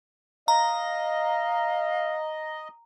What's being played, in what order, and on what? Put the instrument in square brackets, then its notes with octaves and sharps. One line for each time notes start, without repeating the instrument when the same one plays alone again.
[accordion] D#5 [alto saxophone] F5 [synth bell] A#5